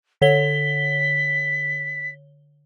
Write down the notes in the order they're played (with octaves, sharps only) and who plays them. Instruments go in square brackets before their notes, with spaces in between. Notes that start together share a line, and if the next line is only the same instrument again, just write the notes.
[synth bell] D3 C#5 G7 [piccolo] B6